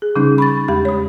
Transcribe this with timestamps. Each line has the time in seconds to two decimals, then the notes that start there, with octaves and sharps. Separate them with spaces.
0.02 G#4
0.16 C#3 G3 C#4 D#4
0.38 B5 C#6 A6
0.68 E2 G#3 G4 B5
0.85 C#5 D#6